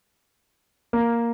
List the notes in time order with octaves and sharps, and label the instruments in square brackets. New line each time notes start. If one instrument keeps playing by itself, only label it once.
[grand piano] A#3